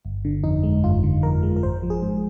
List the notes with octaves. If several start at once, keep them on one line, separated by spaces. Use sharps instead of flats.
G1
D3
F2 D#4
G#3
G1 F4
D3
F2 A#4
G#3
A#4
G#1 C5
F3
G#4
G#2